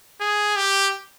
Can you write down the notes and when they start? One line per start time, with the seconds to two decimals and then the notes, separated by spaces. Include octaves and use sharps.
0.20 G#4
0.56 G4